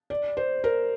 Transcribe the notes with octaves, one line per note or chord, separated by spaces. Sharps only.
D5
C5
A#4